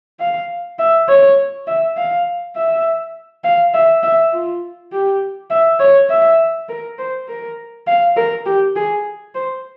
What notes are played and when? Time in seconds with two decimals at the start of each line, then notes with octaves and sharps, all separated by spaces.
0.20 F5
0.79 E5
1.08 C#5
1.67 E5
1.97 F5
2.55 E5
3.44 F5
3.74 E5
4.03 E5
4.33 F4
4.92 G4
5.50 E5
5.80 C#5
6.09 E5
6.69 A#4
6.98 C5
7.28 A#4
7.87 F5
8.16 A#4
8.46 G4
8.76 G#4
9.35 C5